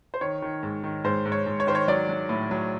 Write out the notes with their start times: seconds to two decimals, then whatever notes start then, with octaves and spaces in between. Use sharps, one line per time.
0.14 C5
0.21 D#3 C#5
0.42 D#3
0.63 G#2
0.84 D#3
1.04 G#2 C5
1.25 G#2
1.32 C#5
1.46 G#2
1.60 C#5
1.67 D#3 C5
1.75 C#5
1.88 F#3 D5
2.09 F#3
2.29 A2
2.51 F#3